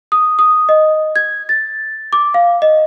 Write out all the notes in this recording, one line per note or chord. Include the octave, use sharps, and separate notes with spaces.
D#6
D#6
D#5
G#6
A6
D6
F5
D#5